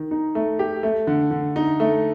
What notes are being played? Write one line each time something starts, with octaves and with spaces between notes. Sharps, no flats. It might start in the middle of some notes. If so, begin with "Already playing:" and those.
Already playing: D#3
D#4
A3
G4
A3
D3
D3
D#4
A3